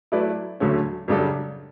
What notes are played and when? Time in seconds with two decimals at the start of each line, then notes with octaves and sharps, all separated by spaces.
0.12 F#3 A3 E4 B4 D5
0.60 D2 D3 F#3 A3 C#4
1.08 F#2 C#3 G3 D4 A4